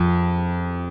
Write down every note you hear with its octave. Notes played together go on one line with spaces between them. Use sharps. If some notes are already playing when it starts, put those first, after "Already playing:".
Already playing: F2